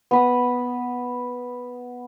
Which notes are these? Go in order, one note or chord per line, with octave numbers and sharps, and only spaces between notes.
B3 B5 D#6